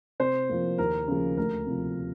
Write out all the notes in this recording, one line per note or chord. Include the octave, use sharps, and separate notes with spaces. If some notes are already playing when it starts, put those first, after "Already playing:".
C3 C5
F3 A#3
D#2 A#4
C#3 F3 A#3
D2 A#4
C3 F3